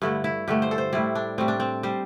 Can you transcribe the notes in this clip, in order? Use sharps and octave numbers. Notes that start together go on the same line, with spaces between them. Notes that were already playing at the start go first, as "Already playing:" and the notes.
G2 D3 A3 E4
E4
G2 D3 A3 G4
C5
A4
C5
A2 G3 E4
D4
A2 G3 C4
D4
C4
G3 C5